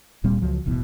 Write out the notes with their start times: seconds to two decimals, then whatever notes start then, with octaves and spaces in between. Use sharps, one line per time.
0.24 D1 A#2 G3 C4
0.41 C#2 F3 F#3
0.66 D#1 A1 B2 E3